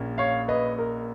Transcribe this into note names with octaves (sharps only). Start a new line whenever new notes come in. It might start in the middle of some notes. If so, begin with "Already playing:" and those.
Already playing: A#1 A#2 A#3 C#4
C#5 F5
B4 D#5
A#4